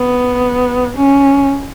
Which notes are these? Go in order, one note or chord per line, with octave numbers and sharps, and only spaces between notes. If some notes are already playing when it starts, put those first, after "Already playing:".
Already playing: B3
C#4